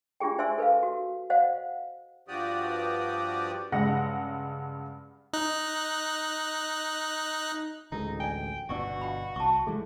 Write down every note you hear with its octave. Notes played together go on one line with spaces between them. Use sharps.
D4 F4 G4 G#4 G5
D4 C5 E5 G#5 C6 E6
A4 B4 D#5 F5
F#4
C5 D#5 F5 F#5
G2 F3 F#4 G4 D5 D#6
G2 C#3 G#3 F#5 A#6
D#4 F#6
A1 D2 G#3 D#4 A#4
D5 G5 G#5
G1 B2 D4 F#4 D5 C#6 E6
F5 G5 B5
C2 A5 C#6
E3 G#3 A3 G#4